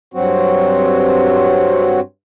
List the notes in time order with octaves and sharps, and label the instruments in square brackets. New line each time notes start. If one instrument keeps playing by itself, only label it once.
[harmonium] G2 F#3 C4 F#4